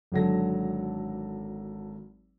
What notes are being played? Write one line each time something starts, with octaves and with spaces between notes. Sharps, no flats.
G#1 D3 F#3 A4 A#6